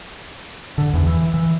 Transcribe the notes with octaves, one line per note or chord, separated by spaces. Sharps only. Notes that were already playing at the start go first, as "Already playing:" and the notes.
D3
E2
E3
E3